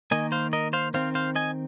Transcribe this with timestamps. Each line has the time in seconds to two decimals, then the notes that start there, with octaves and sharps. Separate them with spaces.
0.11 D#3 A#3 D#5 G#5
0.32 C5 F5
0.53 A#4 D#5
0.73 C5 F5
0.94 D#3 C4 C5 F5
1.15 C5 F5
1.35 D#5 G#5